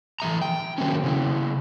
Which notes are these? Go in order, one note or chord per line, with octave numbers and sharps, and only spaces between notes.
E3 G#3 E5 A#5
G5
D#3 E3 F#3 A#3 C4 C#4
C#3 E4